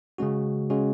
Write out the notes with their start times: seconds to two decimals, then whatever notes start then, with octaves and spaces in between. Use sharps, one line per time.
0.18 C#3 G#3 C#4 F#4
0.70 C#3 G#3 C#4 F#4